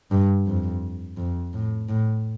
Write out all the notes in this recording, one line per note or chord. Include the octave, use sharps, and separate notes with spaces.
G2
F2
F2
A2
A2